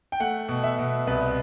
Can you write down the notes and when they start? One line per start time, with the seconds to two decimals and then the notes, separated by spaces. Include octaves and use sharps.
0.12 G5
0.20 A3 F#5
0.49 B2
0.64 E5
0.79 B2
1.07 C2 B4